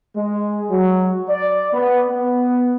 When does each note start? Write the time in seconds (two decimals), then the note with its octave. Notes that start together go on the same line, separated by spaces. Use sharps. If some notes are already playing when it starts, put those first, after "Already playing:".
0.16 G#3
0.70 F#3
1.29 D5
1.73 B3
2.08 B3